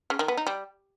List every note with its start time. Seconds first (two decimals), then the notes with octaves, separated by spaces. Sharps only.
0.10 C#3
0.19 D#3
0.28 B3
0.37 D#4
0.47 G3